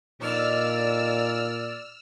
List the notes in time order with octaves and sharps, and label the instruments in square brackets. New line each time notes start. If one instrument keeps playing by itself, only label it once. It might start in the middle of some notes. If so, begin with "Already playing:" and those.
[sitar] F2 D4 D#4 [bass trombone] A#2 [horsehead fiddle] D5 [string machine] E6 F6